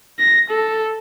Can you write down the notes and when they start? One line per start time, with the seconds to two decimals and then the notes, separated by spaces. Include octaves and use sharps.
0.19 A#6
0.50 A4